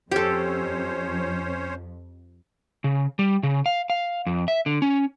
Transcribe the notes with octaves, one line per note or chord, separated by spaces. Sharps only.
F2 C#4 G4 A4 C5 C#5
C#3
G3
C#3
F5
F5
F2
E5
D3
C#4